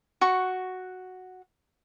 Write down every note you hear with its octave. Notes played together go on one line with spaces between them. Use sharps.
F#4 C#6